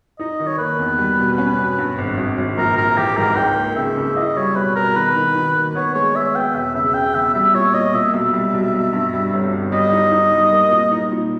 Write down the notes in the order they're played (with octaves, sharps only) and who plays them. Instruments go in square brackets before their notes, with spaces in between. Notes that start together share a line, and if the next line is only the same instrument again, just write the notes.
[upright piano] D#4 [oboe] D#5
[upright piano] D#3
[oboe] C#5
[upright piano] A#3 [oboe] B4
[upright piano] E2
G3
B2
C#4
B2
G2
G#1
G#1
G#1
[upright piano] A#1 [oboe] A#4
[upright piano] A#1 [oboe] A#4
[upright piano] E3 [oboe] G4
[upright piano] G#2 [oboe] A#4
[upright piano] C#2 [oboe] G5
[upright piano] A#3
[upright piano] C#3 [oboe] E5
[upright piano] C#3
[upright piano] E4 [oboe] D#5
[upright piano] G3 [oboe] C#5
[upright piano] B2 [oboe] B4
[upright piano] B2 [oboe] A#4
[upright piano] D#3 [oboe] B4
[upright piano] D#3
D#3
A#3
[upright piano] B3 [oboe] C#5
[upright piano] G#3 [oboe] C#5
[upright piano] G#3 [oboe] E5
[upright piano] B3 [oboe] G5
[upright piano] E1 [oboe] E5
[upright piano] C#3 [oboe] E5
[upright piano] C#3 [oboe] G5
[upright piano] E2 [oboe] E5
[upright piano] G3 [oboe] E5
[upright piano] A#2 [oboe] C#5
[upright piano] A#2 [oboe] D#5
[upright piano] A#2 [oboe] E5
[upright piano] B1 [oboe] E5
[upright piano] G3
B1
B1
G2
G3
G1
G1
[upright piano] G3 [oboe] D#5
[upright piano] D#4
D#4
G3
A#3
A#2
D#4
A#2